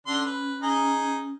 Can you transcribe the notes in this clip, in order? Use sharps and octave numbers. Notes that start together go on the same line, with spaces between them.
D3 C#4 D4 C6
B4
D#4 G#4